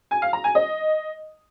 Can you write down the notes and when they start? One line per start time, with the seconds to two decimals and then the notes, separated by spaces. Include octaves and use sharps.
0.11 G#5
0.22 F5
0.33 A#5
0.44 G#5
0.55 D#5